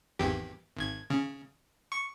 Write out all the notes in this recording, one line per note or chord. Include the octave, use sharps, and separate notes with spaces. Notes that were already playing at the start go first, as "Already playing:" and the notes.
G#1 E2 G4
G#1 G#6
C#3
C#6